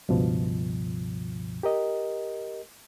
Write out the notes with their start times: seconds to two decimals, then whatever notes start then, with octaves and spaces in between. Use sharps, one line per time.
0.09 C#2 G2 B2 F3
1.63 G4 A#4 D#5